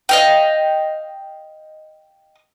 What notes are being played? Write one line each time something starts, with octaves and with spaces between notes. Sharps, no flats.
D#5 F5 G5